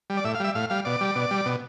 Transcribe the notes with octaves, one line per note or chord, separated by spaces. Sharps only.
G3
D5
A2 E5
F5
G3 E5
A2 F5
G3 F5
B2 D5
G3
B2
G3
B2